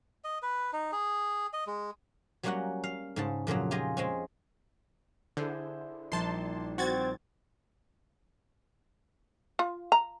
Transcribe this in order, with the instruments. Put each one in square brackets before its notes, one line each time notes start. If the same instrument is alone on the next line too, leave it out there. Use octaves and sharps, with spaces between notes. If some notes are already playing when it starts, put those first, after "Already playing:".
[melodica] D#5
B4
D#4
G#4
D#5
G#3
[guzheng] F#3 G3 A#3 C#4 F#4 F#5
F5
G#2 C#3 A5
F2 A#2 C#3 F#3
F4 G4 G#4 D#5
G#3 C4 C#4
[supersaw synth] D3 [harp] E4 G#4 C5
[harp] A#1 G3 D#4 [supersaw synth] A5 C6
[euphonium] C4 [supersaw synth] F#4 G#6 A6
[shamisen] F4
A#5